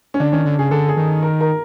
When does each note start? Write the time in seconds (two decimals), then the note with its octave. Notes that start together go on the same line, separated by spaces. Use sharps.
0.14 C#4
0.20 D3 D4
0.32 D#3 C#4
0.45 D3
0.59 C#3 G#4
0.71 D3 A4
0.88 G#4
0.97 D#3
1.23 A#4
1.41 A#4